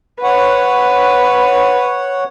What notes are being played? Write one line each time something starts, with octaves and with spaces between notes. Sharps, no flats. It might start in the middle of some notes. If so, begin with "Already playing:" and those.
B4 C#5 F#5